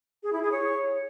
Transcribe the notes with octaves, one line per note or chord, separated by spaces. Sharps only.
G#4
E4
G#4
C#5